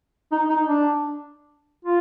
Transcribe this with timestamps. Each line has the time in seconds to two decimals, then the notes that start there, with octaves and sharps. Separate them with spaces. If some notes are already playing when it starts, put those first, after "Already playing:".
0.32 D#4
0.49 D#4
0.66 D4
1.85 F4